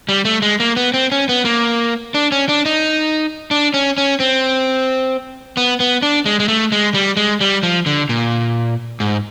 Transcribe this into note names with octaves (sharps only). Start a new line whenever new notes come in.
G3
A3
G#3
A#3
B3
C4
C#4
B3
A#3
D4
C#4
D4
D#4
D4
C#4
C#4
C4
B3
B3
D4
G#3
G#3
A3
G#3
G3
G#3
G3
F3
D3
A#2
G#2